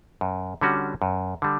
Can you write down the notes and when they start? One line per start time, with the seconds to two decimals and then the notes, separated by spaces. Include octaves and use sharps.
0.21 F#2
0.61 D3 G3 C#4 F#4
1.02 F#2
1.42 D3 G3